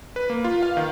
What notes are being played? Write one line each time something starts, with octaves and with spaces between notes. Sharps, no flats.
B4
A#3
F4
F5
D#3